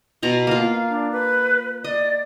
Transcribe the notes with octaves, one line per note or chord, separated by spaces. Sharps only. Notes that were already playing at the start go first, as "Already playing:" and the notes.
B2 A#5 C6
A#3 F4 F5
D4
B4
D5 D#5